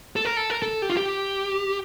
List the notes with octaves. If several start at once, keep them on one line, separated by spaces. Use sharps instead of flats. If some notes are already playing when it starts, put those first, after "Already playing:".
A4
A#4
A4
A#4
A4
G4
F4
G4